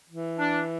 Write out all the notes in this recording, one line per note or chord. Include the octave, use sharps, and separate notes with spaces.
E3
D4